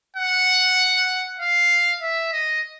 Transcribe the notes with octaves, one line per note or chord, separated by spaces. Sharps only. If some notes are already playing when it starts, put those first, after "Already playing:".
F#5
F5
E5
D#5